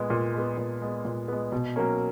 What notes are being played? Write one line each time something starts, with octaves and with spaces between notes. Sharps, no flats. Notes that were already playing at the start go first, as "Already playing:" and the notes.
Already playing: A#2 G#3 B3
A#2
G#3 B3
A#2
G#3 B3
A#2
G#3 B3
B2
F#3 A#3 C#4